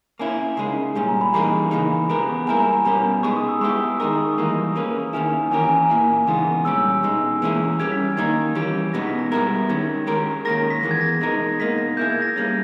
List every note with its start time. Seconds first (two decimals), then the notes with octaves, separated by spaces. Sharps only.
0.19 A#3 C#4 E4 G#5
0.57 C#3 G#3 D#4
0.95 A#2 G3 C#4 G#5
1.09 A#5
1.21 B5
1.33 E3 G3 A#3 D#4 G#4 A#5
1.71 C#3 E3 A#3 D#4
2.09 G#3 B3 G4 A#4
2.47 G3 A#3 E4 A#4 G#5
2.60 A#5
2.73 A#5
2.85 B2 G3 C#4 G4 A#5
3.23 G#3 B3 D#4 G#4 C#6
3.37 D#6
3.49 E6
3.61 G#3 B3 E4 G4 C#6
3.81 E6
4.00 D#3 G#3 D#4 A#4 D#6
4.12 D#6
4.25 C#6
4.38 E3 G3 A#3 D#4 A#5
4.76 A#3 C#4 G#4 B4
5.13 D#3 A#3 C#4 E4 G#5
5.51 E3 A#3 C#4 G4 A#4 G#5
5.64 G#5
5.77 A#5
5.90 A#2 A#3 E4
6.27 C#3 E3 G#3 B3 D#4
6.65 A#2 G3 C#4 G4 E6
7.03 B2 G#3 D#4
7.42 E3 A#3 C#4 E4 G#4
7.79 G3 C#4 G4 G#6
7.92 B6
8.04 G#6
8.17 D#3 A#3 D#4 A#4 G#6
8.55 E3 G3 C#4 G4
8.93 B2 G#3 B3 D#4 A#6
9.07 B6
9.19 A#6
9.32 G3 B3 E4 A#4 G#6
9.69 D#3 G#3 C#4 G#6
10.07 G#3 C#4 G4 A#4
10.45 D#3 A#3 C#4 G4 A#4 A#6
10.58 A#6
10.70 B6
10.81 E3 G#3 B3 A#6
10.91 G#6
11.01 A#6
11.21 B2 G#3 D#4 A#4
11.60 B2 A#3 D#4 B6
11.78 A#6
11.97 A#3 E4 G#4 G6
12.09 G#6
12.22 A#6
12.36 G3 A#3 C#4 G#6